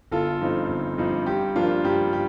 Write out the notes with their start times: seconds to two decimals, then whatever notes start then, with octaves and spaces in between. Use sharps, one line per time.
0.12 G1 F4 A4
0.41 G2 F3 C4 D#4
0.70 G1
0.98 G2 F3 C4 D#4
1.26 G2 G4
1.56 F3 A#3 D4 F4
1.84 G2 G4
2.13 G4